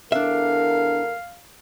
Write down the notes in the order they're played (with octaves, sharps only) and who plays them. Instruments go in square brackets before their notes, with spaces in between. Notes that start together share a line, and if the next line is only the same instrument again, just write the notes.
[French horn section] E2 A4 A#4 [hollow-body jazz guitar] D4 E5 [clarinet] F5